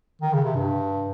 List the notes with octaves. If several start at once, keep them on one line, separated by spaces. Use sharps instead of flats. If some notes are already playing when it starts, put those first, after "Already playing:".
D#3
C#3
C3
G2